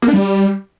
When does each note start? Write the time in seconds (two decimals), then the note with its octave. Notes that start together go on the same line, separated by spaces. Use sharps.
0.02 A#3
0.08 D4
0.13 G3